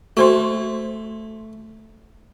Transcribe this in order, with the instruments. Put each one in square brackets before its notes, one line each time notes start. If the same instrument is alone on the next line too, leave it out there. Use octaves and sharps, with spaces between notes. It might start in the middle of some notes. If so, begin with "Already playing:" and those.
[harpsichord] A3 [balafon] F#4 C5 C6